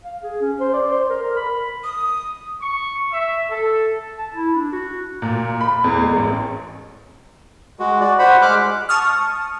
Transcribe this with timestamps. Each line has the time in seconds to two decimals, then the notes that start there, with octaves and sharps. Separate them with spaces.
0.04 F5
0.23 G#4
0.41 C#4
0.60 C5
0.73 D5
0.91 C5
1.10 A#4
1.22 A#4
1.36 B5
1.84 D#6
2.61 C#6
3.12 E5
3.50 A4
4.18 A5
4.34 E4
4.55 D4
4.73 F#4
5.22 A#2
5.61 B5
5.84 E2
6.02 G#3
6.16 A1
7.79 G#3 F#4
8.00 F#4 D5
8.19 C5 F#5 B5
8.42 G#3 D6 F6 F#6
8.89 A5 C#6 D#6 F6